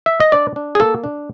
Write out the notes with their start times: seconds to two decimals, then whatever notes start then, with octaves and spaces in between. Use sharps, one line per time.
0.06 E5
0.20 D#5
0.32 D4 D5
0.56 D4
0.75 G#4
0.80 A#3 A4
1.04 D4